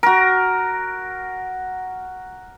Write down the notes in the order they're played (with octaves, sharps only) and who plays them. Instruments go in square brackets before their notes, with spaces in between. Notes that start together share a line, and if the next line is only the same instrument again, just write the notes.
[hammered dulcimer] F#4 A#4